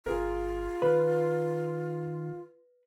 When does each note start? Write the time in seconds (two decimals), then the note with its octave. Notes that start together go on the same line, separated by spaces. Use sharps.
0.06 G1 F4 G#4 A#4
0.82 D#3 B4